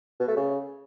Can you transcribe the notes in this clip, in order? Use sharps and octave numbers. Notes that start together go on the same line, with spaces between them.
B2
A3
C#3